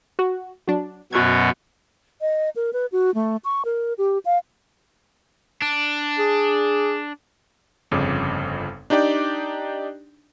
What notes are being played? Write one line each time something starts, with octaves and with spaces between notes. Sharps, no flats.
F#4
F#3 D4
F#2 B2 F#3 F#4 G#6
D#5
A#4
B4
F#4
A3
C#6
A#4
G4
F5
D4
G#4
G1 F2 C#3 D6
D4 D#4 G4 D5 G5